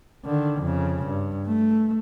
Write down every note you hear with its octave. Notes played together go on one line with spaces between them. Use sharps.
D3 D#3
F2 C#3
G2
A3